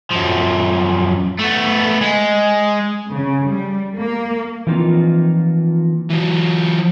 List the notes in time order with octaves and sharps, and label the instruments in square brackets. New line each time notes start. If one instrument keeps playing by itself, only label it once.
[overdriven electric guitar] F#2 F3
A3 B3
G#3
[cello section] C#3
G3
A#3
[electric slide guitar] E3 F3 A#3 C4 D#4 F4
[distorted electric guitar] E3 F#3